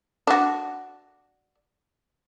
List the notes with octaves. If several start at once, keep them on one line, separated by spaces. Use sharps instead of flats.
D4 F#4